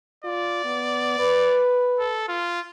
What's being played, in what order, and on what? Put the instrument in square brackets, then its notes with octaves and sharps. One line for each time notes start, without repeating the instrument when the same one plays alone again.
[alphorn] F4 [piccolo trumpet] D5
[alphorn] B3
B4
[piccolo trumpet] A4
F4